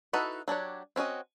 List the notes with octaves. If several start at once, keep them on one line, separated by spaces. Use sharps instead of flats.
D#4 E4 F#4 A4 B4
F#3 D4 G4 C#5
C4 C#4 F#4 D#5